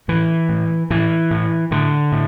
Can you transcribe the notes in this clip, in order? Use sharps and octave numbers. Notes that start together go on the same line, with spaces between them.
A2 E3
A2
A2 E3
A2
A2 D3
A2